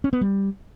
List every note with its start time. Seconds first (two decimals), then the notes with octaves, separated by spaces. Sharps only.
0.04 C#4
0.13 B3
0.21 G3